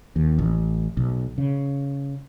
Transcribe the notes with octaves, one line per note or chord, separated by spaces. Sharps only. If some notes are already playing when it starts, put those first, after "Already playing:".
D#2
A1
B1
C#3